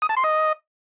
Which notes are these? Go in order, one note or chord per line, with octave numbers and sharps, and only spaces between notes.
D#6
A5
C6
D#5